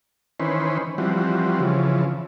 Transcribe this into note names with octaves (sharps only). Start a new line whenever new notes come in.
D#3 E3 C#4 B4 C5
E3 F3 G3 C4 F#4
C#3 E3 F3